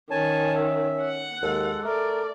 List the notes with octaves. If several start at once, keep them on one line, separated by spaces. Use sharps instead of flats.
D#3 C#4 G#5 A5
E5
F#5
D#2 G#3 A4
A3 A#4 D5